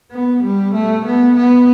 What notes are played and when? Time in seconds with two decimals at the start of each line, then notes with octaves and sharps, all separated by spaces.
0.12 B3
0.43 G3
0.74 A3
1.05 B3
1.36 B3